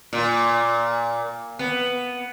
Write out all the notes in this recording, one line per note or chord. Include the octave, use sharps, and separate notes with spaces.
A#2
B3